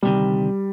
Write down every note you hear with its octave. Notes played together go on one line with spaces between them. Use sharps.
D2 C3 D#3 G3